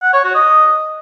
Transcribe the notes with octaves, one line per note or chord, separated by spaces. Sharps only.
F#5
C#5
F#4
D#5